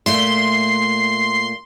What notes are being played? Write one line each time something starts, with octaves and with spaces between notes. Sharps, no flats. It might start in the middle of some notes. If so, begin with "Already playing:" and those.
A#2 A3 E5 C6